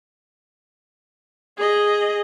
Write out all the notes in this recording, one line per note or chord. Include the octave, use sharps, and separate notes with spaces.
G#4 D#5